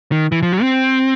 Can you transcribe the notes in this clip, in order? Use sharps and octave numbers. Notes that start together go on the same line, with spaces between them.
D#3
E3
F3
F#3
C4